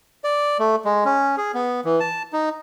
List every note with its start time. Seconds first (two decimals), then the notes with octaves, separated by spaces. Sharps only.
0.24 D5
0.59 A3
0.85 G#3
1.05 C#4
1.38 G#4
1.54 B3
1.85 E3
2.00 A5
2.33 D#4